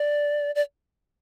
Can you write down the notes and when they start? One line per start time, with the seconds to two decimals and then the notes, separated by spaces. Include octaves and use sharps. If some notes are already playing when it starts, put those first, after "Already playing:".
Already playing: D5
0.55 D5